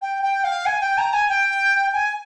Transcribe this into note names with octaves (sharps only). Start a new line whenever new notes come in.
G5
G5
F5
G#5
G5
A#5
G#5
G5
G#5